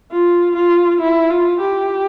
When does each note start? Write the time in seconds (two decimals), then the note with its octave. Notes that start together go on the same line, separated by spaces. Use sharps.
0.12 F4
0.56 F4
1.01 E4
1.30 F4
1.61 G4